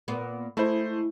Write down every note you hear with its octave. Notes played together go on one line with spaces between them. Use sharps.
A#2 B3
G#3 A3 E4 C5